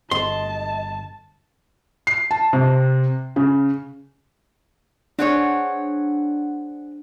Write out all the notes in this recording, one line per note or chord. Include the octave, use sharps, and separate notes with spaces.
G1 D#5 A5 C6
C7
A5
C3
C#3
C4 D4 G#4 C#5 F#5